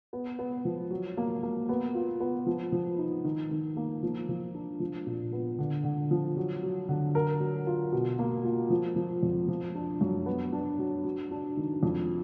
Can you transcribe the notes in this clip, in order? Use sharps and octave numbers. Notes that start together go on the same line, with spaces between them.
B3
B3
F3
F#3
A#3
A#3
B3
F4
B3
F3
F3
D#4
D#3
D#3
A#3
F3
F3
D4
F3
A#2
B3
D3
D3
F3
F#3
F#3
D3
A#4
F#3
F4
B2
A#3
F4
F3
F3
F2
F3
D4
F#2
B3
D4
F#3
F#3
D4
D#3
F2